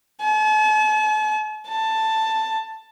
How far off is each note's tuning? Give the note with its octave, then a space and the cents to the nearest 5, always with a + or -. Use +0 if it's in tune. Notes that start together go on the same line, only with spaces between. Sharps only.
A5 -45
A5 +10